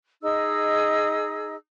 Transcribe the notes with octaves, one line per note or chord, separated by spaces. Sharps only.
D#4 G#4 D#5 E6